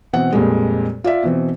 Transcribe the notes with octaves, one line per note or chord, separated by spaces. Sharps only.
B2 E3 C4 F#5
F2 A#2 G3 G#3
F4 D5 E5
B2 E3 C4